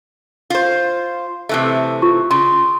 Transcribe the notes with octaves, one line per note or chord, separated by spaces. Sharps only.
F4 C5
C3 E3 A3
F4 C#6
C#3 C6